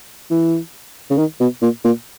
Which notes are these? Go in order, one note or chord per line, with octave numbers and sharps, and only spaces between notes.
E3
C#3
D#3
B2
A#2
A#2